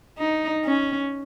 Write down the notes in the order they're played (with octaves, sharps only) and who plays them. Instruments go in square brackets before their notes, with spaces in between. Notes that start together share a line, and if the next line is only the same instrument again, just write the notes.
[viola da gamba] D#4
C#4